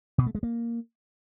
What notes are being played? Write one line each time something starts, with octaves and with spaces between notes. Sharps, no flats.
B2
A3
G#3
A#3